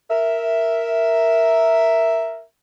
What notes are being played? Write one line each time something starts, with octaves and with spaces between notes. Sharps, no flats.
A#4 E5